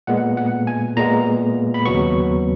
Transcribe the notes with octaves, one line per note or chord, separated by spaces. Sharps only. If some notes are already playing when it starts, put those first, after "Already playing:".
A#2 G#3 B3 F#5
F#5
G#5
A#2 G#3 B3 A#5
B5
D#2 C#3 F#3 B3 C#6